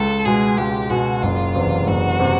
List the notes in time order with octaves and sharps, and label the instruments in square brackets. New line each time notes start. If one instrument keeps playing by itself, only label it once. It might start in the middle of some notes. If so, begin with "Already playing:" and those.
Already playing: [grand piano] C#2 [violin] A4
[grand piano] B2 G#3 [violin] G#4
[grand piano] C#2 [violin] G4
[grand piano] B2 G#3 [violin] F#4
[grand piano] F#1 [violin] F4
[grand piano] E2 C3
[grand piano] F#1 [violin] F#4
[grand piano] C3